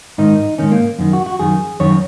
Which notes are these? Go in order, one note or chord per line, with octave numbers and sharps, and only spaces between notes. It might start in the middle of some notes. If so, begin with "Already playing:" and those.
G#2 D#3 D#4
G#2 D#3 C#4
A#3
F#2 D#3
F#4
F#4
F#2 D#3 G#4
F#2 D#3 C#5